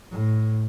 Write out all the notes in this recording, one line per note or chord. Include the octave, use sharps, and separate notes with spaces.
A2